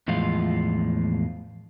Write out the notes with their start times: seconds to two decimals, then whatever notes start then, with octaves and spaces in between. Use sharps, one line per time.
0.08 E2 A2 F3 G#3 F4